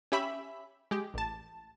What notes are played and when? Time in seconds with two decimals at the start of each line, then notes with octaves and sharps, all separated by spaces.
0.12 C#4 G4 E5 B5
0.91 G#3 G4
1.14 A1 A5